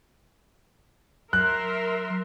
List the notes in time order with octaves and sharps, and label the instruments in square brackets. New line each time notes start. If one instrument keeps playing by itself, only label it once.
[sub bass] F#3 [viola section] A#4 E5 C6 [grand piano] F#6